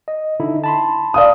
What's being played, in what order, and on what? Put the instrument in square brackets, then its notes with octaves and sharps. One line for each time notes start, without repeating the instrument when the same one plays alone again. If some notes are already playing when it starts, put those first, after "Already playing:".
[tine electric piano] D#5
D3 D#4 E4
A5 B5 C6
[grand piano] D5 F5 D#6